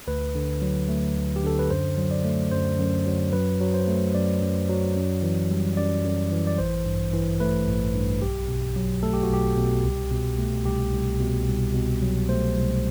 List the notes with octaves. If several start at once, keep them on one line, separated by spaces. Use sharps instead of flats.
D2 B4
D3
F#3
A3
D2
G4
D3 A4
B4
F#2 C5
F#3
D5
A3
F#2 C5
F#2
F#3
F#2 B4
F#3
C5
A3
F#2 D5
F#2
F#3
F#2
E3
G3
F#2 D5
F#2
E3
D5
A1 C5
G2
E3
A3 B4
A1
G2
B1 G4
B2
F#3
A3 A4
G4
F#4
B1 G4
B2
C2
B2
A3
C2 G4
C2
B2
C2
B2
F#3
A3 C5
C2